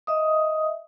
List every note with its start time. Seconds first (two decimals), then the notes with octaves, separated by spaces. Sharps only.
0.07 D#5 E5 D#6